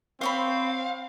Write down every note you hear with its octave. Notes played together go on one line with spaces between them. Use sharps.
C4 C5 C#5 F5 B5